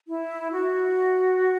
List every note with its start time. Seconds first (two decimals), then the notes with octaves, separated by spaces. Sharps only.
0.08 E4
0.52 F#4